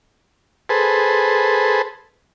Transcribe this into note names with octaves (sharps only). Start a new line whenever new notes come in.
G#4 A4 B4 C5